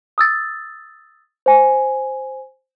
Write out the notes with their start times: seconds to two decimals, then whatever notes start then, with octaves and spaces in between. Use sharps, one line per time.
0.18 D#6 E6 A6
1.46 C5 G#5